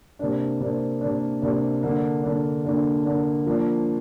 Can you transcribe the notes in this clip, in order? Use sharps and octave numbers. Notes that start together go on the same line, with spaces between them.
C3 A#3 D4
C3 A#3 D4
C3 A#3 D4
C3 A#3 D4
D3 A#3 D4
D3 A#3 D4
D3 A#3 D4
D3 A#3 D4
F3 A#3 D4